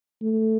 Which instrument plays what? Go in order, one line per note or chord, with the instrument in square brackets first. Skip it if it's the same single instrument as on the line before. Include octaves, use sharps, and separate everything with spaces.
[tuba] A3